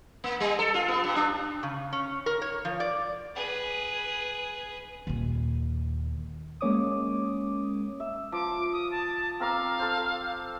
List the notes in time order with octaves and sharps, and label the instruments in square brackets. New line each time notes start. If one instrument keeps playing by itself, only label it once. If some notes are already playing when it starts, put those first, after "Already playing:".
[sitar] A#3
G3
A4
F4
B3
G2
D4
[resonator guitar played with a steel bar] C#3
C#4
A#4
C#5
F3
D5
[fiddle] G#4 B4
[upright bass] D#2 A#2
[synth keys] G#3 A#3 C#4 C#5 D6 D#6
[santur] E5
[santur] F3 [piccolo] D6
[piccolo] D#6
A5
[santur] C4 A#4 D6 [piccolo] F5
[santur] A4 C5